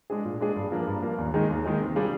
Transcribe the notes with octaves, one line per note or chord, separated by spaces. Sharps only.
G#3 D4 G#4
A#2
G#3 D4 G#4
G2
F3 A#3 D4
G2
F3 A#3 D4
D#2
D#3 G#3 D#4 G#4
D#2
D#3 G#3 D#4 G#4
C3
G3 D4 F4 G#4